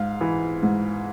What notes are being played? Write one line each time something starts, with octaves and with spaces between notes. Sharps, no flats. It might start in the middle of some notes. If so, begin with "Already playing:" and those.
Already playing: G#2 F5
E3
G#2